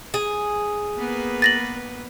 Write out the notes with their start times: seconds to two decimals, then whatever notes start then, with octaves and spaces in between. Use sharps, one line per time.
0.14 G#4
0.98 A#3 B3 B4
1.42 A6 A#6 F#7